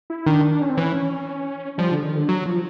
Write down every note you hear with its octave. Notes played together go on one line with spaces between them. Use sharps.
E4
D#3 D4
D4
C#4
C4
E3 C#4
F3 G3
D3
D#3
D3
F#3
F3